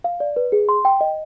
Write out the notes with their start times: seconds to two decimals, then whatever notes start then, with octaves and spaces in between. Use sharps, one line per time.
0.04 F5
0.20 D5
0.36 B4
0.52 G#4
0.69 C6
0.85 G5
1.01 D#5